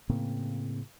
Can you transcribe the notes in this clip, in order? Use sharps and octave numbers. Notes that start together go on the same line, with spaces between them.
A2 C#3 A#3 C4